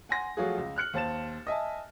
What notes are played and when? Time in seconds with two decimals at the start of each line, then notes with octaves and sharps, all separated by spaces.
0.09 F#5 G#5 C6 A#6
0.37 F3 F#3 A3 F4 F#4 G#4
0.58 C#2
0.76 F6 F#6 C#7 F#7
0.94 D#2 C5 A5 A6 E7
1.47 D#5 E5 G#5 A5